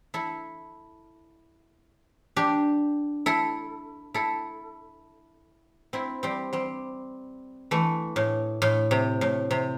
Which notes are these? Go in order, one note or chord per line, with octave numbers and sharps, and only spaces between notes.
E4 A4
D4 G4
E4 A4
E4 A4
C4 E4
G3 C4
G3 C4
E3 A3
A2
A2
C3
A2
C3